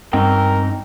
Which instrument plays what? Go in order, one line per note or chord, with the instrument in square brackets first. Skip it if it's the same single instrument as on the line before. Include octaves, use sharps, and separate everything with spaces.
[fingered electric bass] G2 [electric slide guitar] C4 D#4 G5 [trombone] A#4